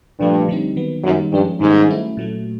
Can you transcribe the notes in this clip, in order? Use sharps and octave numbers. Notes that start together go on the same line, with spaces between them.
G2 A#2 F3 A3
D3 G3 C4 D#4
D#3 F#3 B3
F#2 D#3 G3 A#3 D#4
G2 F3 G#3 C#4
G#2 D#3 G3 A#3 C#4
F#3 A3 C#4 E4
A#2 F#3 A3